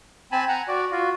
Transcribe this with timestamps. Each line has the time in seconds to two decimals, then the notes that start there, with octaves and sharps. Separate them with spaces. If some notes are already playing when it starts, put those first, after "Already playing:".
0.32 C4 G#5 A5 B5
0.49 F#5 G#5 A#5
0.68 F#4 D5
0.91 F4 F#4